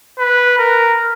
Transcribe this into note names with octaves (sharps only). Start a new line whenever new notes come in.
B4
A#4